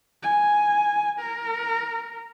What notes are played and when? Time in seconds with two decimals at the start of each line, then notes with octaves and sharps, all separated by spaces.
0.22 G#5
1.20 A#4